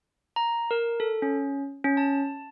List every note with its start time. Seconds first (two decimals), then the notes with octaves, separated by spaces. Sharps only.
0.36 A#5
0.71 A#4
1.00 A4
1.22 C#4
1.84 C#4
1.97 A5